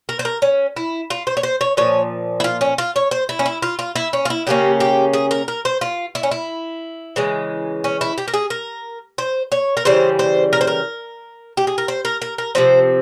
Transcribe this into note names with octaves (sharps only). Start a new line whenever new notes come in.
A#4
C5
A#4
C#4
E4
F4
C5
C#5
C5
C#5
A#2 F3 C#5
E4
F4
C#4
F4
C#5
C5
E4
C#4
E4
F4
F4
E4
C#4
F4
E4
C#3 G3 A#3 C#4 G4
G4
G#4
A#4
A#4
C5
F4
E4
C#4
E4
C#3 E3 G#3
C#4
E4
G4
A#4
G#4
A#4
C5
C#5
A#4
C#3 E3 G3 C5
C5
A#4
C5
A#4
G4
G#4
A#4
C5
A#4
A#4
A#4
C3 F3 C4 C5